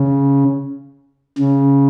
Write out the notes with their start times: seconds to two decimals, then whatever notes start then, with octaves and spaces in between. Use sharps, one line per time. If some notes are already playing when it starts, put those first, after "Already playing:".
Already playing: C#3
1.38 C#3